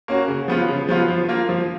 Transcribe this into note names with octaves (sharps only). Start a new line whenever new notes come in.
A#3 C#4 F#4
C#3
F3 B3 F4
C#3
F3 B3 F4
F3
A#3 F4
F3